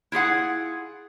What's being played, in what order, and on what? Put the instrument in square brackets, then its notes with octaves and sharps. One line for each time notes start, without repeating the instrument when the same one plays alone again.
[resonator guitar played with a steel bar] E4 F4 G#4 F#5